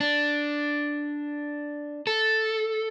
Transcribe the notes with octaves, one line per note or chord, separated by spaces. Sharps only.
D4
A4